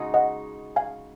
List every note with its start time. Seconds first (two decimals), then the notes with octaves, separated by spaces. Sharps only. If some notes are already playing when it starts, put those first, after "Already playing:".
Already playing: C#3 G#3 D#4 F#4
0.14 D#5 F#5
0.76 F5 G#5